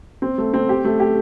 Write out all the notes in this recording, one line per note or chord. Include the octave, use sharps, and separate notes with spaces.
C4
A3
C4
G4
A3
G4